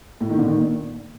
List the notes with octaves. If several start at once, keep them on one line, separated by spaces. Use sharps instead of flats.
A2
D#3
D3
D#3
A#2